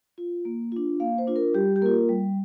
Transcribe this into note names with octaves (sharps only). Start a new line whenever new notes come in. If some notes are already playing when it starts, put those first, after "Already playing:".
F4
A#3
D4 F4
A#3 F5
C5
D4 F4
A#4
G3 G4
G4
A#3 F4 A#4
G3